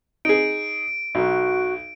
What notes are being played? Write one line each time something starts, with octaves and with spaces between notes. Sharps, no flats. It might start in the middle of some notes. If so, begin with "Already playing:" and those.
D#4 G#4 D7
B1 F#4